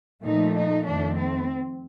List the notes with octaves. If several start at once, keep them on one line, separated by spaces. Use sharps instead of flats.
A#2 F3 A3 D#4
D#4
F2 D#3 A3 D4
C4